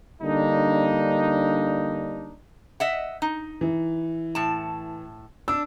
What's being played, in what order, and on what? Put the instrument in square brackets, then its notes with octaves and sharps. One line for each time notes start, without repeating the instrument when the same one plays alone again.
[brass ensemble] D3 G3 A#3 D4 D#4
[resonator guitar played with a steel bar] D#5 E5 F#5
D#4
[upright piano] E3
[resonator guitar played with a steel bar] A2 A5
[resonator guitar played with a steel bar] D4 [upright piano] E6